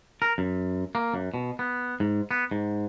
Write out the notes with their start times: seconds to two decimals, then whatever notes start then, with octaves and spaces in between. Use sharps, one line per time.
0.22 A#4
0.38 F#2
0.95 A#3
1.14 F#2
1.34 B2
1.59 B3
2.00 G#2
2.31 B3
2.51 G#2